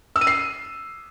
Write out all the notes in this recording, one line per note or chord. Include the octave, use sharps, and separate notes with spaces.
E6
D#7
C7